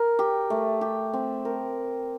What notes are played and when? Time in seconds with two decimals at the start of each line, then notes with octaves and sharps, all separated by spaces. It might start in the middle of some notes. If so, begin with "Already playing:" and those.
Already playing: A#4
0.19 G4
0.50 A3
0.81 G4
1.13 C4
1.45 A#4